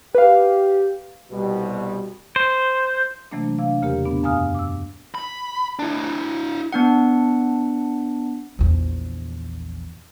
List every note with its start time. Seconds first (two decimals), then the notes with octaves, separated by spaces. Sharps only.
0.15 G4 B4 F5
1.32 C2 B2 G3
2.36 C5
3.31 C3 E3 F#3 A3 A#3 D4
3.58 C3 D4 F5
3.82 E2 C#3 A#3 G4 A#4
4.05 A#2 B3 D4
4.23 F#2 F5 G#5 D#6 F6
4.55 D6 E6
5.15 B5
5.79 D4 E4
6.73 B3 D4 F#5
8.59 A#1 E2